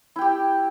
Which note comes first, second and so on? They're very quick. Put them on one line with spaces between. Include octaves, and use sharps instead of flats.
E4 G5 G4